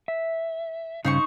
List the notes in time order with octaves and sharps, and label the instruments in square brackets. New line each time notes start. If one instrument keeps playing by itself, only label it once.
[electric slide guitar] E5
[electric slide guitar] G2 C#3 [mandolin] D#4 C5 C#6